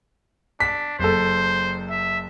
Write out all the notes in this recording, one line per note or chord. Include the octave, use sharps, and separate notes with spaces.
D4 B6
F#1 A4 C5
E5